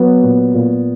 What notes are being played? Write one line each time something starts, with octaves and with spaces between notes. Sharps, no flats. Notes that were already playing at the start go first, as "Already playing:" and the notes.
Already playing: F#3 B3
A#2
A#2